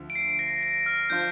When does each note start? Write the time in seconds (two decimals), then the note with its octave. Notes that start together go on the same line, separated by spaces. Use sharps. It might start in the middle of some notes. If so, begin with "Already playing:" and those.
Already playing: D2 D3 F3
0.10 D7
0.15 C7
0.39 A#6
0.63 A#6
0.86 F6
1.10 F3 D4 F4 C5 G6